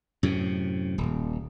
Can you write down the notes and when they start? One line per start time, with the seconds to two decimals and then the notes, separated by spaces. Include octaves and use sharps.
0.23 F#2 A2 C3
0.98 D#1